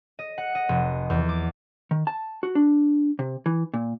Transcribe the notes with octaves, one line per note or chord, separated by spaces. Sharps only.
D#5
F#5
D#5
F1
E2
D6
D#3
A5
F#4
D4
C3
E3
A#2